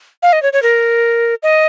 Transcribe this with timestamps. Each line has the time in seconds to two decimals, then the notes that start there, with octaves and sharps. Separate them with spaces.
0.22 F5
0.33 D#5
0.42 C#5
0.53 C#5
0.62 A#4
1.43 D#5